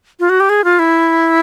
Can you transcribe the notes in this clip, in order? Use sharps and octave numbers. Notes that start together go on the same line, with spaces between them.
F4
F#4
G4
G#4
F4
E4